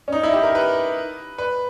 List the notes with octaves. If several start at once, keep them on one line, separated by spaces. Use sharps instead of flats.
C#4
D#4
E4
G4
A#4
B4
B4